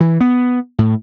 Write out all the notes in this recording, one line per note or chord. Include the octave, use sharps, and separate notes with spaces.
E3
B3
A2